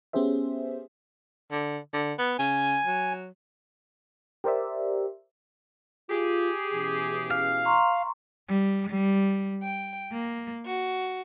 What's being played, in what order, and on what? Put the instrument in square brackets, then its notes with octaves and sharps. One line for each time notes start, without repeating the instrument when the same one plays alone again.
[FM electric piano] B3 C#4 G4 G#4 C5 E5
[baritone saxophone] D3
D3
B3
[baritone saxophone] C#3 [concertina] G#5
[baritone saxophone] F#3
[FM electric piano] G4 A#4 C5 D5 E5
[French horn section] F4 [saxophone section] G4 G#4
[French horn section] B2 E3 C#4
[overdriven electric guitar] F5
[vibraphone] A#5 C6 C#6
[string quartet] G3
G3
G5
A#3
F#4